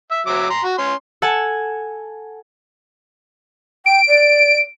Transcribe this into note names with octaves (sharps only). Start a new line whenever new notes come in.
E5
F#3 E5 D6
A#5 C6
F#4
C#4 C6
A4 F#5 G#5 A5
G5 D7
D5